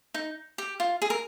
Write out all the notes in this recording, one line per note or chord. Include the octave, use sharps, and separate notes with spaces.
D#4
G4
F4
G#4
A#4